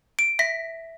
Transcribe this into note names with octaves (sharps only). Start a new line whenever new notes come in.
D7
E5 A#6 B6